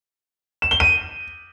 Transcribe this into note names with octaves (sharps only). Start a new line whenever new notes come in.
E7
G7
D#7